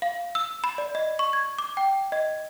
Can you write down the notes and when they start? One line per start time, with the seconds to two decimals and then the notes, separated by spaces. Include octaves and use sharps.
0.02 F5
0.35 E6
0.64 B5
0.78 D5
0.95 D#5
1.19 C#6
1.33 G#6
1.59 D6
1.77 G5
2.12 D#5